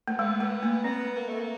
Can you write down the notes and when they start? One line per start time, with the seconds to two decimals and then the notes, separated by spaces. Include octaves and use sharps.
0.08 A3
0.19 G#3 B3
0.40 A3
0.63 A#3
0.84 B3 C4
1.17 A#3
1.29 A3
1.40 A#3